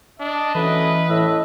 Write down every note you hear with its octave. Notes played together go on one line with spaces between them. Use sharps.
D4 D#5
E3 F#3 A3 C#4 B4
A2 D#5 E5